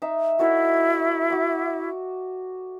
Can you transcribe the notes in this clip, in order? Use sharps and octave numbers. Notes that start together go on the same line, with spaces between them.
D#4 E5
E4 F#4 A4 C#5
F#4 D6